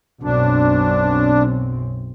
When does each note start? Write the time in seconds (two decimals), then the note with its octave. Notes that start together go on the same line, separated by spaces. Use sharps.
0.23 B1 F#2 C4 D4